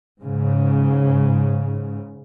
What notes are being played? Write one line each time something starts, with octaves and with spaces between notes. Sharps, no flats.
G#2 C#3